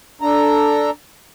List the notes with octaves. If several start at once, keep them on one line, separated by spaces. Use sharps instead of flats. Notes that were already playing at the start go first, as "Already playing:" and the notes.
D4 A4 A#5